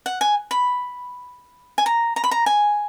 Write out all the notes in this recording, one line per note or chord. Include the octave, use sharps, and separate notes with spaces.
F#5
G#5
B5
G#5
A#5
A#5
B5
A#5
G#5